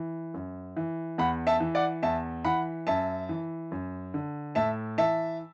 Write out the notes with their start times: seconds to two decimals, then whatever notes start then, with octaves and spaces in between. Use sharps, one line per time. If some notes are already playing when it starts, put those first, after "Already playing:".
Already playing: E3
0.34 F#2
0.77 E3
1.18 E2 F#5 B5
1.47 E5 A5
1.60 E3
1.75 D5 F#5
2.03 E2 E5 A5
2.45 E3 F#5 B5
2.87 F#2 E5 A5
3.29 E3
3.72 F#2
4.14 D3
4.55 A2 E5 A5
4.98 E3 E5 A5